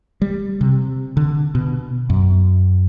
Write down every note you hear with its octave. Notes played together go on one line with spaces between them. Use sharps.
G3
C3
D3
B2
F#2